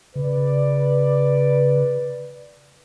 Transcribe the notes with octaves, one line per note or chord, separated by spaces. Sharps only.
C#3 B4 D5